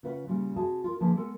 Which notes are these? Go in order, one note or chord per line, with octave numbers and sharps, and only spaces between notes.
C#3 F4 B4 C5 F#5
A#2 C#3 G3
C3 F#4 G#4 D#5 A5
F4 A#4
D3 F3 A#3 G#4 B4 A5
G#3 B3 A4 A#4